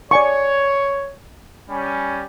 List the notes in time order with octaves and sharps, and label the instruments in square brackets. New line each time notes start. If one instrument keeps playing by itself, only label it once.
[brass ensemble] C#5 [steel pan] D5 G#5 C#6
[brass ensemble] G3 C#4